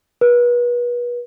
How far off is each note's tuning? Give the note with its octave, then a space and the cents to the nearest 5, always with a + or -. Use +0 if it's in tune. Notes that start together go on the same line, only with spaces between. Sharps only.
B4 -35